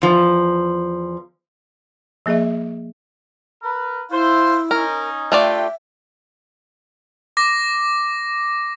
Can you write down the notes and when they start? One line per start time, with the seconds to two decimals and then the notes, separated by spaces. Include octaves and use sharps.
0.02 E2 F3
2.26 F3 A#3 G#4 D#5 E5
3.63 A#4 B4
4.11 E4 F4 C5
4.71 C#4 D#4 A#4
5.32 A3 D4 F4 G4 D5 E5 G5
7.37 D6 A#6